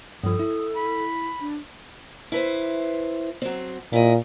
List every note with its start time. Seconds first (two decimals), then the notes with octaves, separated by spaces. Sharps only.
0.24 G2 F3 A4 D#6
0.39 E4
0.74 B5
1.40 D4
2.32 E4 B4 C5
3.42 F#3 C4
3.93 A#2 E4 D#5